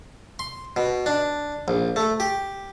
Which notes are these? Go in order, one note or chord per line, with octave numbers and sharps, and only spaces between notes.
C6
B2
D4
A#1
A3
G4